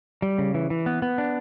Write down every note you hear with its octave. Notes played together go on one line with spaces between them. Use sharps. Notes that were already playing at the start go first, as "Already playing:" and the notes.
G3
C#3
E3
E3
B3
B3
D4